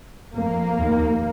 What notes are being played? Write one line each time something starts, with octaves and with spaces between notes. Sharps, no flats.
F2 A#3
D#2